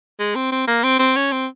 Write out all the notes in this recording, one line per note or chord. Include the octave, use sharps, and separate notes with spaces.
G#3
C4
C4
A#3
C4
C4
C#4
C4